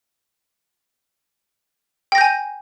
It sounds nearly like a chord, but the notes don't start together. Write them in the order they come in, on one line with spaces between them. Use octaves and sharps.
G5 A#6 G6 G#5